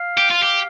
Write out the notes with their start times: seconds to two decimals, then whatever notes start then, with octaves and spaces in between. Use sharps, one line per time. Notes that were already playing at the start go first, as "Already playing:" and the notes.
Already playing: F5
0.17 G4
0.30 F4
0.43 G4